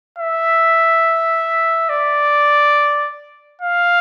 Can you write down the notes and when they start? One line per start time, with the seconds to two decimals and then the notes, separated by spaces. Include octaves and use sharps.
0.18 E5
1.89 D5
3.61 F5